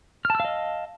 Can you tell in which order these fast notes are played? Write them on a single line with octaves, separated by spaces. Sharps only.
F6 A5 E6 F5 D#5